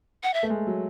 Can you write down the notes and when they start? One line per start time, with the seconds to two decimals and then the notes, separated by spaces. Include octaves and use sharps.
0.23 F#5
0.34 E5
0.43 A3
0.50 G#3
0.67 F#3